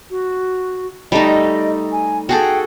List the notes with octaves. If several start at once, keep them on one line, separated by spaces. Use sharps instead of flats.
F#4
G3 A3 D#4 D#5
G#5
F#4 G#4 A4 G5